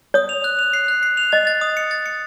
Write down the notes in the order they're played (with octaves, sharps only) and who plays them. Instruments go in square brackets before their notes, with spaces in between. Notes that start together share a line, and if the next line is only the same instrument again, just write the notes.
[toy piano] C#5 [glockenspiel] D#6
[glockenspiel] F7
F#6
F7
C7
F#6
C7
F7
[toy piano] D#5 [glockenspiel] A6
[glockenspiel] A6
D#6
C#7
A6
C#7